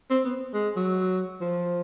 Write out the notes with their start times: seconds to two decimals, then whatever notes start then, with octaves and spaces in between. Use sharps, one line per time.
0.10 C4
0.24 B3
0.54 G#3
0.76 F#3
1.41 F3